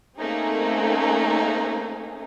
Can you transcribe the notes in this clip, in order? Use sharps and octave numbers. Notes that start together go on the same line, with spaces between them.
A3 A#3 C4 C#4 D#4 G#4